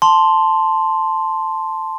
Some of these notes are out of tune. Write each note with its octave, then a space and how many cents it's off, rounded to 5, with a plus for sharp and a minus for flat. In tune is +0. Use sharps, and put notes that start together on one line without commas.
A5 +0 C6 +0